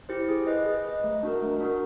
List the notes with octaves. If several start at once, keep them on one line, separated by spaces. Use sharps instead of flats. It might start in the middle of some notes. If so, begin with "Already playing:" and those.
E4 G4 C5
G#4
B4 D#5
G#4
B4 D#5
A3
D4 F#4 A#4
A3
D4 F#4 A#4